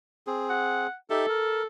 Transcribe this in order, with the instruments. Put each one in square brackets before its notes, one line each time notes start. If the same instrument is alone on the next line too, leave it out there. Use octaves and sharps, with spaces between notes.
[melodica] C4 G#4
[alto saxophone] F#5
[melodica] D#4 G4 E5 [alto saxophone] A4
[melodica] A#4